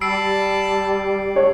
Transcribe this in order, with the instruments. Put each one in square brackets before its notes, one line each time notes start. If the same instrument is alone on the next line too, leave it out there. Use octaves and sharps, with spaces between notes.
[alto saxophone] G3 [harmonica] A5 B5 [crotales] E6 C7 D7
[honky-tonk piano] G4 C#5